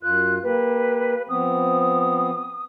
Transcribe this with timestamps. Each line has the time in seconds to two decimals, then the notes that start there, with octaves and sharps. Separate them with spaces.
0.03 F#2 F4 F#6
0.43 A#3 G4 B4
1.29 F3 B3 C4 D#6